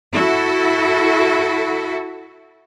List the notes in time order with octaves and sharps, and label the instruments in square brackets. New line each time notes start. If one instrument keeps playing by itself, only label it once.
[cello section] E4 F#4 A4